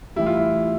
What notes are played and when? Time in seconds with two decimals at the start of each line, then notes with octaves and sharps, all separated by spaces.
0.16 A2 E3 G3 E4
0.26 F4
0.36 E4